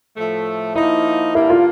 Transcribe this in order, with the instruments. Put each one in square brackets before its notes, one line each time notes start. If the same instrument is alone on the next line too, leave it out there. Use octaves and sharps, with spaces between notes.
[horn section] A2 F3 A3
[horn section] F3 A#3 D#4 [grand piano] E4
[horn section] G2 D3 G3 A#3 [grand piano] E4
[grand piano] F4